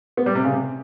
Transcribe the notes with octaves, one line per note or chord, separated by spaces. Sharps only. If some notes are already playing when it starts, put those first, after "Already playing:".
B3
G3
C3
C#3
C3